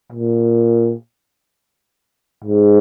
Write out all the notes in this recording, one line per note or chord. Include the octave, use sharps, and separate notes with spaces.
A#2
G#2